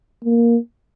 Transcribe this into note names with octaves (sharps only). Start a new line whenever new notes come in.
A#3